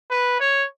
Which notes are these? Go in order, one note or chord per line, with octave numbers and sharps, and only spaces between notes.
B4
C#5